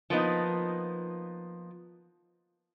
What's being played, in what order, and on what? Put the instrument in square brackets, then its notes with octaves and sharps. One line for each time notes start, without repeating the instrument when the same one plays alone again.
[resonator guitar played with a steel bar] F3 A#3 B3 D#4